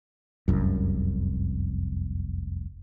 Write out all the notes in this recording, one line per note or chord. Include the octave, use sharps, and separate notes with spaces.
F1 C2 F#2